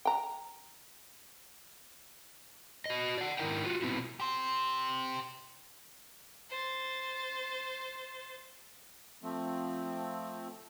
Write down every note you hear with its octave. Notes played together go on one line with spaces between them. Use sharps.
G5 A#5
F#4 D#5
D5 F#5
G#2 D#3 E4 A#4 G5
F4 F#4
B2 B3 C4 E4
G4 C5
C5 A6
F3 A3 C4